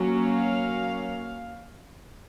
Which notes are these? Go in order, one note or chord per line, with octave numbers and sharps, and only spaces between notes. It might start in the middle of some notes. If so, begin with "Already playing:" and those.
Already playing: F#3 A#3 C#4
F5